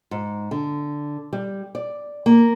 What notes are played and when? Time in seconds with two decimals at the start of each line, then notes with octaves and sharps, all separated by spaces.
0.11 G#2
0.51 D3
1.33 G3
1.75 D5
2.26 A#3